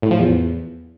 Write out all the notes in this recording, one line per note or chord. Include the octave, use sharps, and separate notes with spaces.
A2
F3
E2